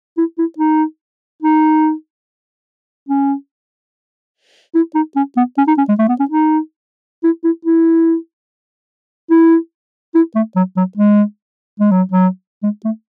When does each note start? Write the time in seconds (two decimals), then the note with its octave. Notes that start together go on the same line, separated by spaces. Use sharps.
0.18 E4
0.39 E4
0.58 D#4
1.43 D#4
3.09 C#4
4.75 E4
4.95 D#4
5.16 C#4
5.37 B3
5.58 C#4
5.68 D#4
5.78 C#4
5.89 G#3
5.99 A3
6.09 B3
6.20 C#4
6.31 D#4
7.24 E4
7.44 E4
7.65 E4
9.31 E4
10.15 E4
10.35 A3
10.56 F#3
10.77 F#3
10.97 G#3
11.80 G#3
11.92 F#3
12.12 F#3
12.63 G#3
12.85 A3